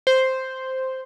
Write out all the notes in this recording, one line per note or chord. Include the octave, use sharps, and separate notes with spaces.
C5